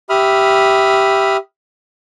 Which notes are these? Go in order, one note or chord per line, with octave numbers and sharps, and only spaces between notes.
G4 E5 B5 D#6 F6